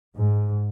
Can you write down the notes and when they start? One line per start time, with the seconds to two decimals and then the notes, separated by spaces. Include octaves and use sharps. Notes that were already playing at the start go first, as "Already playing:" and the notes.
0.15 G#2